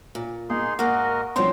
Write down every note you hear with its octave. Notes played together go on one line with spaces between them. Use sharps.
A#2
A#3 D#4 G#4 C6
G#2 A#3 F#4 A#4 D#5 F#5
F3 C4 D4 D#4 C#5 G5 C6